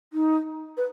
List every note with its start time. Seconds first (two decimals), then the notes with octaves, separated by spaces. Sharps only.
0.13 D#4
0.77 B4